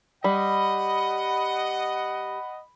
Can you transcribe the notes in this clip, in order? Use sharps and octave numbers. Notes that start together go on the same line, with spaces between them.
G3 D#5 F#5 B5